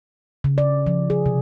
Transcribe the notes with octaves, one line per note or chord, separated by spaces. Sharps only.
C#3
D5
F3
G#4
C3